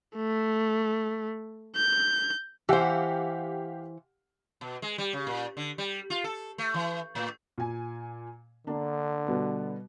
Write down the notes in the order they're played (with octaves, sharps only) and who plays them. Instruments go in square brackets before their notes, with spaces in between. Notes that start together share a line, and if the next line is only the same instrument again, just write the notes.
[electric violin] A3
G6
[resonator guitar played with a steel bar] E3 C5 [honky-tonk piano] G4 F5 F#5
[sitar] B2
G#3
G3
C#3
A#2
D3
G3
F4
A4
A3
E3
A2
[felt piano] A#2 G#5
[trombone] D3 [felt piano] A#3 D4
[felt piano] B2 G3 B3